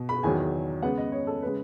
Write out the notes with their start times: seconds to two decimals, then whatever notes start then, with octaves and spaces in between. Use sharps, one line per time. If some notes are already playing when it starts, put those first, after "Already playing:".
Already playing: B2
0.09 B5
0.23 E2 D#3 F#3 G#5
0.82 C#3 G#3 B3 F#5
0.98 D#5
1.12 C#5
1.27 A4
1.42 C#3 G#3 B4